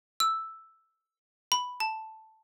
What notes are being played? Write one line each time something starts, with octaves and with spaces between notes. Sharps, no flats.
E6
B5
A5